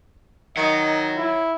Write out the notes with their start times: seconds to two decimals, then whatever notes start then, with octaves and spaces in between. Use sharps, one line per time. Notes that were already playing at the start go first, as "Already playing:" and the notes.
0.57 D#3 C#5 D#5 F#5
1.17 E4